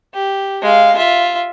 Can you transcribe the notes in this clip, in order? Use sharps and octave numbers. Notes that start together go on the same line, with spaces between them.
G4
G#3 F5
F4 E5